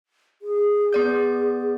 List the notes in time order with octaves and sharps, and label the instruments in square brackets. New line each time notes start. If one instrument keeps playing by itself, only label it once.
[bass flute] G#4
[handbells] B3 D5 G6